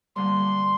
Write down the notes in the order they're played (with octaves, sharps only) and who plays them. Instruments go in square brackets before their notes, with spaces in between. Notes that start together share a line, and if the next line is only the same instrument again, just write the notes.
[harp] D3 G3 A#3 [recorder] C6